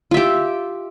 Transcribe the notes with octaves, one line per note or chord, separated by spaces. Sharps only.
F4 G4 E5